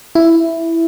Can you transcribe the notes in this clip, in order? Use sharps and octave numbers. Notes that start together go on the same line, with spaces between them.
E4